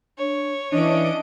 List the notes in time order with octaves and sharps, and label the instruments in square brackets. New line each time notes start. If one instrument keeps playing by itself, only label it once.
[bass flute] D4 [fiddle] C#5
[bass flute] E3 [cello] C#4 D#5 [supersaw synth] D4 D7